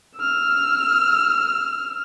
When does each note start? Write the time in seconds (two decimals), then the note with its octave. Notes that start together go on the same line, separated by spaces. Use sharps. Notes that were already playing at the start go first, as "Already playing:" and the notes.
0.18 E6 F6